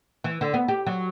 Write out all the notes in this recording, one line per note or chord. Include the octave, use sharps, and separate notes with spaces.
E3
D3
B3
G4
F#3